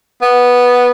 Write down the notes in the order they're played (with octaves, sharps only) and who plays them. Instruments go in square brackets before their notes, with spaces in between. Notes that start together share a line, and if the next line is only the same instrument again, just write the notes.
[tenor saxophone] B3